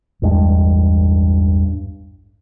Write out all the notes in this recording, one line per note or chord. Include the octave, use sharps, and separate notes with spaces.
A1 E2 G2 G#3